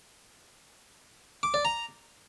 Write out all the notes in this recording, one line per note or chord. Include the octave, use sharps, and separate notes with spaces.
D6
D5
A#5